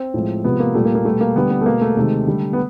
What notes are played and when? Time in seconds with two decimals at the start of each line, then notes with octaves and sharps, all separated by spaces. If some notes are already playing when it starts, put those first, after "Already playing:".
Already playing: C4
0.14 A2 F3 G#3
0.44 C3 F3 G#3 B3
0.60 A#3
0.74 A#2 G3 A3
0.85 A#3
0.95 A#3
1.05 B2 G3 A3
1.20 A#3
1.36 D3 G3 B3
1.51 B3
1.61 A3
1.66 B2 G#3 A#3
1.81 A3
1.97 C3 D#3 G#3
2.27 D3 G3
2.53 B3